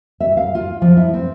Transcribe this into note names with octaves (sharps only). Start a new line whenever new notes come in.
E5
F5
F4
F3
E4
C4